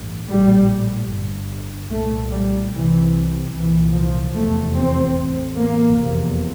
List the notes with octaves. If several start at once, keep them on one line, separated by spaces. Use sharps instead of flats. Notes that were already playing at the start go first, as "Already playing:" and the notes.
Already playing: A1 G2
A#1 A2 G3
G1 G2
C2 A#2 A3
G3
C2 C3 E3
C2 E3
A#2
F3
F1 E2 C3 A3
C4
A1 A2
A#3
F1 E2 C3